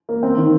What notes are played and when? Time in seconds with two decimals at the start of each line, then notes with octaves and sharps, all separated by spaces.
0.09 A#3
0.23 C4
0.37 D#3